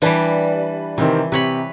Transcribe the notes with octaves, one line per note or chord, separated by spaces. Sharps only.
E3 G3 D4 B4 A5
C3 D#3 E3 C4
C3 B4 C#5 B5